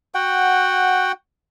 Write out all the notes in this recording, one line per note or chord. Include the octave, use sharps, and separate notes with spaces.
F#4 F#5 G5